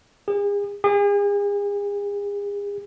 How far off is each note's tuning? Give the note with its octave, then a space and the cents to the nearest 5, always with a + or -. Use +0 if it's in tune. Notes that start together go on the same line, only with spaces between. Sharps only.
G#4 -40
G#4 -40